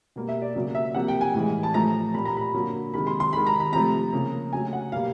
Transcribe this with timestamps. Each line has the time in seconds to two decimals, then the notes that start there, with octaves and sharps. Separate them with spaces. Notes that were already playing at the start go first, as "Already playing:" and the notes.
0.16 B2 G3 A#3
0.29 E5
0.42 D5
0.55 C#3 F#3 A#3
0.75 E5
0.94 C3 F3 A#3 F#5
1.08 G5
1.21 G#5
1.34 A2 E3 G#3
1.63 A5
1.74 A2 F3 A3 A#5
2.14 A#2 G3 A#3 B5
2.25 A#5
2.37 B5
2.54 D3 F#3 A#3
2.93 C3 D#3 G#3 B5
3.07 C6
3.20 C6
3.33 D#3 G#3 B5
3.46 A#5
3.60 B5
3.73 C3 F3 A3 A#5
4.13 C#3 F3 A#3
4.53 C#3 F#3 A3 G#5
4.73 F#5
4.92 B2 G3 A#3 F5